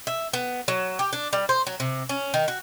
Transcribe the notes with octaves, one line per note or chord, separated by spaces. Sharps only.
E5
B3
F#3
G4
D4
G3
C5
F#3
C3
C#4
D#3
F#4